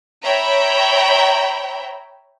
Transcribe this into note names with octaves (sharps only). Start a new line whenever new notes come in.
C#5 E5 G5 A#5 B5